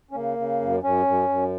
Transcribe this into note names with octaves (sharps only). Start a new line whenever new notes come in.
C#4
C#3 A#3
C#3
F#2
F#2 C#4
F#2
F#2